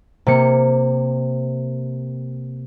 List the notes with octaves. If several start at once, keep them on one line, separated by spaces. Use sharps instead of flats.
C3 A#3 C#7